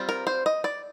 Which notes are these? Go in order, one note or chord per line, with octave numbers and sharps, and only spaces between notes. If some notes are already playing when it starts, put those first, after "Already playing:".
Already playing: G3 C4 F4
A#4
C5
D#5
D5